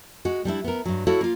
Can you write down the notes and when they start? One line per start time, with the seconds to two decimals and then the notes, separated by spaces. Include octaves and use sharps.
0.25 G#3 F#4
0.45 G3 D4 E4
0.64 B3 A#4
0.85 G2 F#3
1.07 E4 F#4 A4 C#5 F5
1.21 A#3 F4